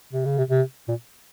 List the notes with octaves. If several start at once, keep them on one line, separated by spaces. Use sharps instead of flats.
C3
C#3
C3
C3
A#2